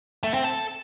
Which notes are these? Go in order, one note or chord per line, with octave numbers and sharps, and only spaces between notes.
A3
C4
A4